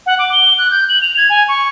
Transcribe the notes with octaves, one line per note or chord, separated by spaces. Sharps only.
F#5
D6
G7
F#6
G6
F#7
F7
G#6
G#5
C#6